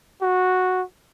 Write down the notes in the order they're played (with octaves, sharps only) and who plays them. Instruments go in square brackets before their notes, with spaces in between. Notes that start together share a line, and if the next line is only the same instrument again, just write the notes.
[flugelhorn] F#4